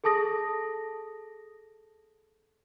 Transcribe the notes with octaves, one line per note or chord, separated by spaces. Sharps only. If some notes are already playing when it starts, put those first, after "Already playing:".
G#4 A4 A5 D#6 A#6